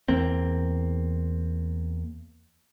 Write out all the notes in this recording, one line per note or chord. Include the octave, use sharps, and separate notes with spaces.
E2 A#3 C4